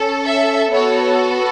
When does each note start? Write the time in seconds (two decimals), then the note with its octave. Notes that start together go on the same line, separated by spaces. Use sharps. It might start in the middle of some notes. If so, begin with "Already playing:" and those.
Already playing: C#4 A4
0.26 E5
0.72 B3 F#4 A4 C#5